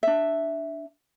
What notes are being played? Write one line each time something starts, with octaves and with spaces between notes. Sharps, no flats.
D4 E5